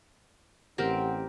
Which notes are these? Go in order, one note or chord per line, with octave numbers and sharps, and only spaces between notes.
A1 C4 G4 A#4 F#5